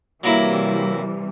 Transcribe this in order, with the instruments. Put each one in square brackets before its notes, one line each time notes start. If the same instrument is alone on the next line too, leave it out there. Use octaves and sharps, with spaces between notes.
[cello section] C3 E3 G3 [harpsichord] F#3 A#3 E4